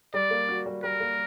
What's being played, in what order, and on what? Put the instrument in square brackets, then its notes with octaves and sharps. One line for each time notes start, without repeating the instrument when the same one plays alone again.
[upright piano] G3 [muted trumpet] D5
[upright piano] A#3
F#4
G3
[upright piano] G3 [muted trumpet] A#4
[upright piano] A#3